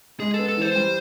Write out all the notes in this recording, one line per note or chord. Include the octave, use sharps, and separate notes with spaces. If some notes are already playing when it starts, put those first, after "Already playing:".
G#3 G#4
A4
B3
A4
E3 C5
G3